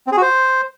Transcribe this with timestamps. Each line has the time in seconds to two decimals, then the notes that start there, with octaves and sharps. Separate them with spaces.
0.07 C4
0.12 G#4
0.17 F#4
0.22 C5